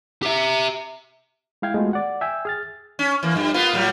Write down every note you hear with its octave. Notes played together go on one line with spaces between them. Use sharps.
G4 E5
G#3 E4 F5 G5 G#6
G#3 A3 B3 F4 F#4 B4
D5 F#5
E5 G5 G#5 E6
G#4 F6 A6
C#4
E3 A#3
G2 A#2 G3
A#3 B3 F4
A2 F#3 G3